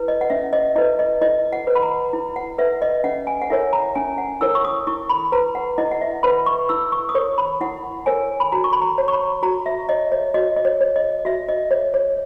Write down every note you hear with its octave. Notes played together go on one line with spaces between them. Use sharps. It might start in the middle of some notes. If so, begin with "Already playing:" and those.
Already playing: E4 B4
D#5
F#5
C#4 E5
D#5
E4 B4 D#5
D#5
E4 D#5
F#5
B4
B5
A#5
E4
F#5
B4 E5
D#5
C#4 F#5
G#5
F#5
E4 A#4 C#5 E5
A#5
C#4 G#5
F#5
E4 A#4 C#5 E6
C#6
D#6
E4 C#6
B5
B4 A#5
F#5
E4 D#5
F#5
E5
B4 B5
C#6
E4 E6
C#6
D#6
A#4 C#5 C#6
B5
E4 F#5
A#4 C#5 G#5
B5
F#4 A#5
C#6
B5
A#5
C#5
C#6
B5
F#4 A#5
E5
C#5 D#5
C#5
F#4 D#5
D#5
C#5
C#5
D#5
F#4 E5
D#5
C#5
C#5